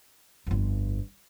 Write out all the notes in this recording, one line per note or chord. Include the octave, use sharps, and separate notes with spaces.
G1 F2